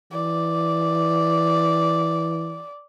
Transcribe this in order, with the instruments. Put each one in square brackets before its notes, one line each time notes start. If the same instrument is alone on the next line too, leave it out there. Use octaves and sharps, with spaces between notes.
[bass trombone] E3 [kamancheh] D5